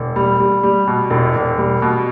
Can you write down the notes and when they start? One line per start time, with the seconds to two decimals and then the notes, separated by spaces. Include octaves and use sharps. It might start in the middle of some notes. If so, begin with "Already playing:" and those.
Already playing: E1
0.16 G3
0.40 G3
0.63 G3
0.87 B2
1.10 E1
1.35 E1
1.58 G3
1.82 B2